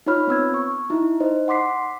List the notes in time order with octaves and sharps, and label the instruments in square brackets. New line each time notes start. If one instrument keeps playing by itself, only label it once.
[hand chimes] D#4 F4 C#5 B5 F6
B3 C4 E6 G#6
C#6
D#4 E4
D#4 C5 D#5
F#5 C6 D6 B6 C7